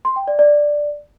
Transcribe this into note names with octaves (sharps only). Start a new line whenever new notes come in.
C6
G5
D5
D5